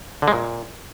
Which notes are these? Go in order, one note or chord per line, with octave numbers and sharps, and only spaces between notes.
D3
G#3
A#2